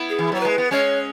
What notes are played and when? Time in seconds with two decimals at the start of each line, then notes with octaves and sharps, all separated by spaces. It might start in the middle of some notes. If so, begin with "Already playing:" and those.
Already playing: B3 E4
0.09 G#4
0.19 E3
0.32 F#3 C#5
0.40 G#3 B4
0.58 B3
0.71 G#3 C#4 C#5